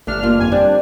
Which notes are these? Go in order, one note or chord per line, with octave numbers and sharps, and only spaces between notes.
G1 A3 D4 F6
A#3 F4
G1 F2 G#5
G3 C4 D4